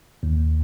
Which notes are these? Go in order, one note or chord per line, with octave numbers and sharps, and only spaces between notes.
D#2